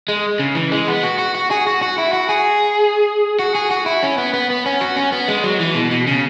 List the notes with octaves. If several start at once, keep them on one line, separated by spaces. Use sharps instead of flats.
G#3
C#3
E3
G#3
B3
F#4
F#4
F#4
G#4
F#4
F#4
E4
F#4
G#4
F#4
G#4
F#4
E4
C#4
B3
B3
B3
C#4
F#4
C#4
B3
G#3
F#3
E3
B2
B2
C#3